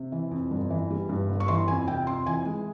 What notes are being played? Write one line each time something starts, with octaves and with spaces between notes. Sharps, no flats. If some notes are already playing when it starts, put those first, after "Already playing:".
Already playing: C3
E3
F2
G1
E3
G3
G2
G1
C#6
E3 C6
F2 G#5
C3 G5
F2 C6
E3 G#5
G#3